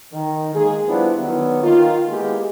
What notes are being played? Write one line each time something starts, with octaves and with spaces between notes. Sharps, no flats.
D#3
G#3 A#3 D#4 G#4
F3 G3 B3 D4 E4
D3 D#3 F#3 B3
D#3 A#3 F4
G#3 A#3 B3 E4 G4 G#4